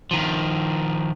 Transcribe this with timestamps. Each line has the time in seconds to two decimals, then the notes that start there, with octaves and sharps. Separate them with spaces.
0.11 D#3 F3